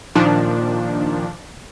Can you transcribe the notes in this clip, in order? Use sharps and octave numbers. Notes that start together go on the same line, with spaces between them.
A#2 D#3 F3 D4